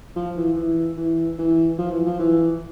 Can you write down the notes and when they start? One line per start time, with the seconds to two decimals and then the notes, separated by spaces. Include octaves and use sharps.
0.16 F3
0.36 E3
0.56 E3
0.97 E3
1.38 E3
1.78 F3
1.92 E3
2.06 F3
2.19 E3